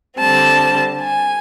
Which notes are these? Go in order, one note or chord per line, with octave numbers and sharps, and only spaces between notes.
D3 G3 C4 A5
G#5